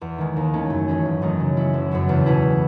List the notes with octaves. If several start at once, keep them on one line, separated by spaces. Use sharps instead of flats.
E2
D#3 G#3
D#2
D#3 A3 C#4 E4
F#2
E3 A3 C#4 G#4
G#1
F#2 D#3 A3 D#4
C#3
G#3 C#4 E4
F#1
F#2 C#3 F#3 B3
E2
B2 A3 E4 G#4